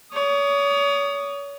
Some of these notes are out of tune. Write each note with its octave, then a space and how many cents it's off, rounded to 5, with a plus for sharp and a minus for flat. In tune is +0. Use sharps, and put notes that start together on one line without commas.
C#5 +35 D#6 -15